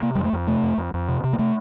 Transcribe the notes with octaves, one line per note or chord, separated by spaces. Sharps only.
C3 A#3
F2 G3
A3
F2
C3 A3
F2
F2
F2
C3
C3
A#3
C3 A3